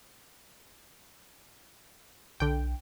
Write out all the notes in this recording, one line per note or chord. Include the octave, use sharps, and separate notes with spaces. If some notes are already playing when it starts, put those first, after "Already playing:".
B1 D3 G5